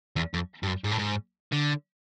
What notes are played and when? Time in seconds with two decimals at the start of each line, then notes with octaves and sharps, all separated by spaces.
0.16 E2
0.34 F2
0.63 G2
0.67 F#2
0.84 G#2
0.91 A2
0.98 G#2
1.52 D3